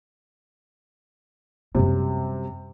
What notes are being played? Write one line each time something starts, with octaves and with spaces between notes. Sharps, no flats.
F#2 C3 G3